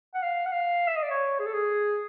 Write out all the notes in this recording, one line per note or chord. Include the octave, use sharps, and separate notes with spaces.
F#5
F5
F#5
F5
E5
D#5
D5
C#5
G#4
A4
G#4